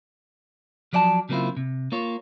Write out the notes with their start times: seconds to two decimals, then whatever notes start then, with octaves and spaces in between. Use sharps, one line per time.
0.93 F3 F#3 D5 F#5 A5
1.29 C#3 F#3 A#3 C4 E4 F4
1.57 C3
1.92 A#3 F4 C#5